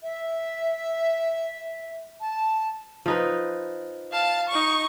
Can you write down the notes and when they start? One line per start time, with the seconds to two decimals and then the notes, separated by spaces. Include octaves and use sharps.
0.03 E5
2.21 A5
3.06 F3 D#4 B4
4.12 F5 A5
4.49 D#4 C#6